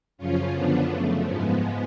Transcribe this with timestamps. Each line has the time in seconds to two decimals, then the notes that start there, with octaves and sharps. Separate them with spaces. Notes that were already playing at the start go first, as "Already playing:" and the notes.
0.18 F#2 C#3 F3 C#4 F4
0.53 F#2 D3 F3 B3 D4
0.89 F#2 C#3 F3 A3
1.24 G#2 F3 G#3 B3